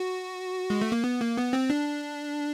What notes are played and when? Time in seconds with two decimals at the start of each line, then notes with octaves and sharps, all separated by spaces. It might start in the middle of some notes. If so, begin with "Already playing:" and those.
Already playing: F#4
0.70 G#3
0.81 A3
0.92 A#3
1.04 B3
1.21 A#3
1.37 B3
1.53 C4
1.70 D4